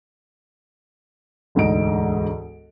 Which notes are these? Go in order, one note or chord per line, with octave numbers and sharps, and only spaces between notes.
E1 D2 G#2 D#5 D7